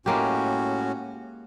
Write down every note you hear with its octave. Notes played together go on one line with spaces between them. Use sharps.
A2 G#3 A#3 C#4 F#4 G4